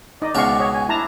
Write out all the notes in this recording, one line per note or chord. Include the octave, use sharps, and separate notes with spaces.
D#4 D5 D#5
C#2 B2 C#4 E5 F5 C#6
C#5 D#5
G#5
D4 E4 A5 A#5